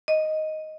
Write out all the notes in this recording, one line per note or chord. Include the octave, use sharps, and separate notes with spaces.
D#5